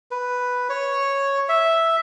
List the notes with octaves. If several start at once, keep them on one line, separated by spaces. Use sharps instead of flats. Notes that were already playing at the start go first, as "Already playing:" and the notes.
B4
C#5
E5